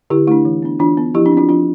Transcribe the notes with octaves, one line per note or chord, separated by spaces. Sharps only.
D3 E4 G4
A3 D4 E4
E3
B3 D4
E3 D4 F4
B3 D4
F3 E4 G4
D4
C4
D4 F4
F3 D4 F4